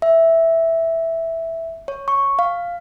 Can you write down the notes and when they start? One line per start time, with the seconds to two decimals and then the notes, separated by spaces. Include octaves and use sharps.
0.02 E5
1.88 C#5
2.08 C#6
2.39 F5